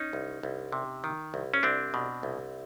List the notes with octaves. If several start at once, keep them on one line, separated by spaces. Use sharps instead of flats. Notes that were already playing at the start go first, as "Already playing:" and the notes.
Already playing: C#4 D#4
C2
C2
C3
D#3
C2
C#4
C2 C4 D4
B2
C2